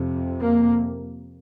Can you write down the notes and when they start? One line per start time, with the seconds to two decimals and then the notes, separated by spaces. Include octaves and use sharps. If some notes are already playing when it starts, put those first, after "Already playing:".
Already playing: F2 C3
0.40 A#3